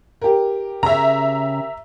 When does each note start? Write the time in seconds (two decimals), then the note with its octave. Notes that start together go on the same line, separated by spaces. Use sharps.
0.22 G4 A#4
0.83 C#3 E5 A#5